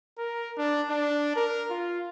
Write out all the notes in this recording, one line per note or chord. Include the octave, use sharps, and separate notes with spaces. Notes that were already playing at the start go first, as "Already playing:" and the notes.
A#4
D4
D4
A#4
F4